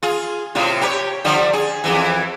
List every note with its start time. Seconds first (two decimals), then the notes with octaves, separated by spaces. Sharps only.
0.03 F4 G#4
0.55 A2 C3 F4
0.81 G4 A#4 C#5
1.25 D3 F3 G3
1.53 G#4
1.84 F2 A#2 E3